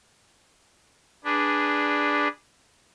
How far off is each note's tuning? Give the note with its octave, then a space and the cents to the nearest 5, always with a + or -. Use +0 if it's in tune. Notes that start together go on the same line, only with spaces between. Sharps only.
D4 +0 G#4 -10 B4 +0